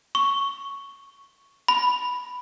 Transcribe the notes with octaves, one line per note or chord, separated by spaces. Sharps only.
C#6
B5